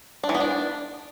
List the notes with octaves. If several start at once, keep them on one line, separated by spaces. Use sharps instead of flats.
D4
E3
B3
D4